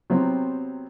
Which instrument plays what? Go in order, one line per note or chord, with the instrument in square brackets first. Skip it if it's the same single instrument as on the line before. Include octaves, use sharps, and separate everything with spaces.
[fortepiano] C3 F#3 B3 C4